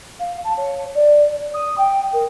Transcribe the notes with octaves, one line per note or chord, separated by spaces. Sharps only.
F5
A5
C#5
D5
D#6
G5
A#4